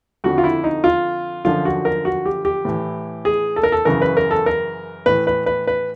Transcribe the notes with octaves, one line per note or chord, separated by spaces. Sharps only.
F2 D3 F3 F#4
F4
E4
D#4
F4
F#2 D3 F3 F4
F#4
A#4
F#4
G4
G4
A2 E3
G#4
A4
A#4
A4
F#2 C#3 E3 A#4
B4
A#4
A4
A#4
A2 E3 B4
B4
B4
B4